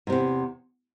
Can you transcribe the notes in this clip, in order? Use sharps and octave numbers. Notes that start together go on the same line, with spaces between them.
E2 G#2 C3